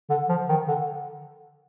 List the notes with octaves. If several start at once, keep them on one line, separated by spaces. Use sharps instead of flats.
D3
F3
D#3
D3